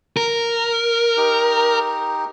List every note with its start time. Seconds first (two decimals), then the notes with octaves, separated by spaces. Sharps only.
0.17 A#4
1.17 D#4 G4